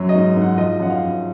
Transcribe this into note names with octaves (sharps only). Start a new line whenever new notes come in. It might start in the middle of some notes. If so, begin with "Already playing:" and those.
Already playing: F#2 F#3
D#5
G#2
G#2 F#5
F3 D#5
F#2 F#5
F5
F#2